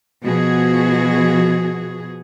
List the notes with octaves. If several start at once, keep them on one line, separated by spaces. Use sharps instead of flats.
B2 F3 F#4 G#4